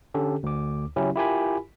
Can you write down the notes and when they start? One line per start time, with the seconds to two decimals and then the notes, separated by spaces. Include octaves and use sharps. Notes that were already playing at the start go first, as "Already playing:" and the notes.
0.14 D3 C#4 G4 A4
0.43 D2 D6
0.96 C#3 F#3 C#4 E4 G4
1.16 E4 F4 G4 A#4 G#5 B5